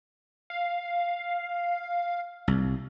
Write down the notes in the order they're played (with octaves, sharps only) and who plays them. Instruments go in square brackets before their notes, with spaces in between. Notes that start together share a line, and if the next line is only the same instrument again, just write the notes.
[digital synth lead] F5
[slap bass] C2